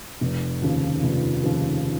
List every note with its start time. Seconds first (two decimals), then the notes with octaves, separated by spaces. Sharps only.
0.21 F1
0.62 D#2 C#3 F3
1.03 F1
1.44 D#2 C#3 F3